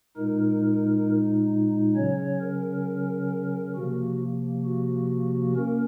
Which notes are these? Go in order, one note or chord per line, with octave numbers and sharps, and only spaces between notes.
A#2 G#3 D#4 A#4
C#3 F#3 C#4 C#5
A#4
C3 F3 A#3 F#4
F#4
A#3 C#4 A#4